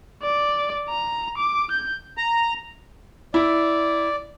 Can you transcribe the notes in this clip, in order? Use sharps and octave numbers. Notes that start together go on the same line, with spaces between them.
D5
A#5
D6
G6
A#5
E4 D5